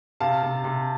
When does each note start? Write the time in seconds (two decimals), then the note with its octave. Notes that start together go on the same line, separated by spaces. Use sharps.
0.20 C3 F5 A5
0.43 C3
0.64 C3